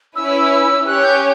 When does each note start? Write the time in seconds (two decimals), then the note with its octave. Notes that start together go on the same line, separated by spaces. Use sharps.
0.16 C#4 E4 B4 E6
0.86 C#4 G4 C#5 F#6
1.04 G6